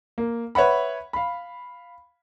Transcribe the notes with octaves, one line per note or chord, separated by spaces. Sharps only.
A#3
B4 C#5 E5 F#5 B5
F5 B5